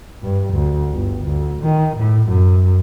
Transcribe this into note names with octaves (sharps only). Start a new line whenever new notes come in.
G2
D2
G1
D2
D#3
A2
F#2